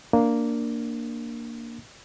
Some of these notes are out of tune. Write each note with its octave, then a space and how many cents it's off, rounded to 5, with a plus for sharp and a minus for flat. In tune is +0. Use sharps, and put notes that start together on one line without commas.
A#3 +0 D4 +0